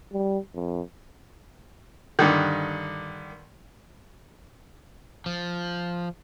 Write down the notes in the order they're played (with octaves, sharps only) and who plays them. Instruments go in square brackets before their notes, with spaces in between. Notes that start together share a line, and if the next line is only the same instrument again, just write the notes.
[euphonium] G3
F2
[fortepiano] G2 D3 D#3
[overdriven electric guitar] F3